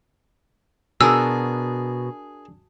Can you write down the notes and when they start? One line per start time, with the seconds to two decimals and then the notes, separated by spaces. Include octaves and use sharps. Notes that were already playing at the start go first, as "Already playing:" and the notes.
1.01 B2 D4 F#4 G#4 A#4 E6